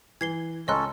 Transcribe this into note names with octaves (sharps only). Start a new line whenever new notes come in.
E3 G#6 C7 G7
C#2 C#4 A4 C#5 D#5 A#5 C6 F#6